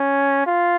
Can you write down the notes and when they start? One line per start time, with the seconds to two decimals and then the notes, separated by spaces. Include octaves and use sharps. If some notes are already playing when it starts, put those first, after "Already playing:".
Already playing: C#4
0.46 F4